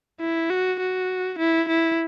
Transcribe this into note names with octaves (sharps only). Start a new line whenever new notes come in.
E4
F#4
F#4
E4
E4